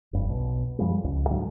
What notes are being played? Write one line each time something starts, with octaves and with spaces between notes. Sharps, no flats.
F1 G2
B1 B2
F#2 F3 G3 G#3
C#2
G#2 D3 F#3 G#3